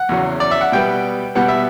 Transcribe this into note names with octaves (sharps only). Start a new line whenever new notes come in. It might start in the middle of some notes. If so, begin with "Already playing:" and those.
Already playing: F#5
E2 C#3 F#3
D5
E5
F#5
B2 G3 B3 G5
B2 G3 B3 F#5
E5